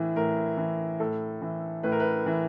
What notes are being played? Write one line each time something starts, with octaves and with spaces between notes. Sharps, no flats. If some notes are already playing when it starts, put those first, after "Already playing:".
Already playing: A2 E3
A2 A#4
E3
A2 A4
E3
A2 B4
A#4
B4
E3